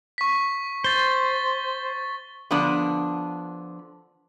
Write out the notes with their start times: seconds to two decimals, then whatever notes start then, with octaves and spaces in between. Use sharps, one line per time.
0.18 C#6 B6
0.84 C5 A6 G7
2.51 D3 F3 B3 D4